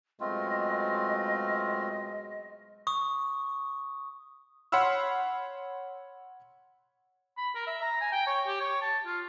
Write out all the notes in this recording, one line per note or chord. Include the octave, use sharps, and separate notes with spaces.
B2 F#3 G#3 A3 C4 F4 D#5
C#6 D#6
C#5 F#5 B5 C6 E6 F6
B5
A#4
E5
A#5
G#5
G5
C#5
G4
C#5
A5
F4